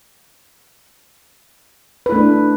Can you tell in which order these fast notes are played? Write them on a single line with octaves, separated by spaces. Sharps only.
B4 E4 A3 D4